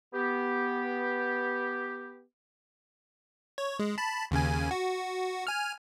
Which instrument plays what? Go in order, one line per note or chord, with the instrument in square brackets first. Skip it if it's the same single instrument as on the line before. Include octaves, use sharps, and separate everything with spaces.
[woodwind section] B3 G4
[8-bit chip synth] C#5
G#3
A5 B5
D#2 C#3 G#5
F#4
G#5 F6